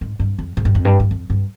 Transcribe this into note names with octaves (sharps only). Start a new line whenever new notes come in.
G#2
G2
F2
G#2
G2
F2
G2
G2
F2
G2